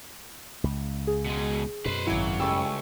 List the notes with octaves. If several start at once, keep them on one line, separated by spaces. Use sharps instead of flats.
C#2
G#4
B2 G#3
F#2 B2 B4 C5
G#1 C#3 F#3 E4 C#5 D6
C#2 G3 A3 C#4 C#6 E6